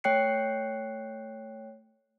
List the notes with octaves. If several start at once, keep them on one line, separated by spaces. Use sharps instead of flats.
A3 C#5 G5 F#6 C7 C#7